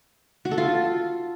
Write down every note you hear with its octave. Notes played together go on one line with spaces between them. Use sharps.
F#4
A4
F4